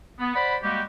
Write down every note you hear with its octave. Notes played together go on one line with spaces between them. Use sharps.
B3
C5 D5 F#5 B5
G3 G#3 A#3 F#4 G4